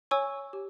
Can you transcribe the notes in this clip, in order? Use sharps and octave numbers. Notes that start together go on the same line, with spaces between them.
C#5 G#5 C#6 E6
G4